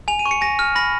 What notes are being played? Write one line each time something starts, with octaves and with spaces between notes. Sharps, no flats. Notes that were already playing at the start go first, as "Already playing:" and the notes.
G#5 F7
D#7
C#6
C#7
G#5 A#6
F6
B5 A#6